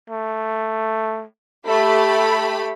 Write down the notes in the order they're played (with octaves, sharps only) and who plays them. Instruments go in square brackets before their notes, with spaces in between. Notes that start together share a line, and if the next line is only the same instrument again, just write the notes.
[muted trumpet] A3
[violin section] A3 G4 B5 [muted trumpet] A4